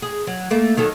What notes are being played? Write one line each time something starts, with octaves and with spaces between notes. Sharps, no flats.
G#4
F#3
A3 A#3
D#3 F#3 A4